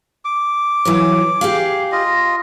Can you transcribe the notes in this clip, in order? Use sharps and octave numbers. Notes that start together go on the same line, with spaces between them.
D6
E3 F#3 C#5
G4 G#4 F5
F4 D#5